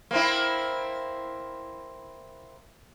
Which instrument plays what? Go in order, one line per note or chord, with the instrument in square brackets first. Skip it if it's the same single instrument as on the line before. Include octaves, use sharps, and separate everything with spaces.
[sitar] A#3 C4 E4